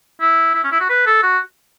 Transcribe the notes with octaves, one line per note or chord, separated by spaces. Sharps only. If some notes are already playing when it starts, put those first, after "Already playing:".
E4
E4
C#4
E4
F#4
B4
A4
F#4